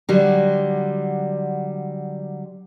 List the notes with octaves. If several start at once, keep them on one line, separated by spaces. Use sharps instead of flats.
D3 F#3 G3